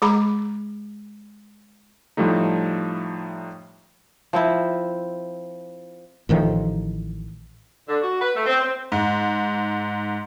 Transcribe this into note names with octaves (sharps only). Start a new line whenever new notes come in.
G#3 G#4 A#5 B5 D6
A2 F3 G3 A3 D#4
F3 C4 E4
A1 A2 D#3 F3
D3
F#4
B4
A3
C4
C4
G#2